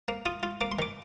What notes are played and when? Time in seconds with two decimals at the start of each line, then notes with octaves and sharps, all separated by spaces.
0.08 A#3
0.25 F4 D#6
0.43 F4
0.61 A#3 D6
0.72 C6
0.79 D#3 D6